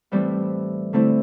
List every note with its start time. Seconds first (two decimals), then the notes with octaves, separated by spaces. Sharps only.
0.12 A2 E3 G3 C4
0.93 D3 A3 C4 E4